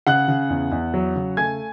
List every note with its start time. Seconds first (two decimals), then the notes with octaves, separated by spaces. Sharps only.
0.07 C#3 F#5 F#6
0.28 C#3
0.50 E2
0.72 E2
0.94 F#3
1.15 C#3
1.37 A3 G#5 G#6